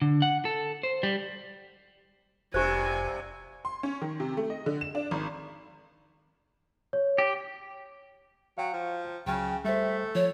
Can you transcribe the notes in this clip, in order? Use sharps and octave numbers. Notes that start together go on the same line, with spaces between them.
D3
F#5
A4
C5
G3
F1 G2 C3 G4 C5 G#5
C6
C#4
D#3
C3
A3
D#5
D3
E7
D4
G#1
C#5
G4
F#3 F5 G5
F3
C#2 C#3 F#3 G5 F6
G3 A3 C5 E5
F3 C#5